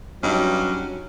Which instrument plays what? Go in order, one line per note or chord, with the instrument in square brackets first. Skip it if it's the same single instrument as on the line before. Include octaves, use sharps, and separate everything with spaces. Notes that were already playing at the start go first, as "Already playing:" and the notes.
[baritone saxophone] G2 [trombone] F#3 [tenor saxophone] C#4 [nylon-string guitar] D#4